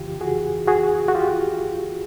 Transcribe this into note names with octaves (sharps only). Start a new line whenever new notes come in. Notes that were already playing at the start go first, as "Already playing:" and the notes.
Already playing: F2 C#3 E3 F4 G4
F#4 G#4
F#4 G#4
F#4
F4 G4